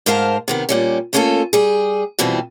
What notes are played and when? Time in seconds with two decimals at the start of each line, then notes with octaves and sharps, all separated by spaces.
0.06 G#2 A#4 C5 F5 A5
0.48 C3 D#3 B3
0.69 A#2 G3 C#4
1.13 A3 A#3 C#4 F4 G4 A4
1.53 G3 G#4
2.19 F2 B2 E3 G3 C4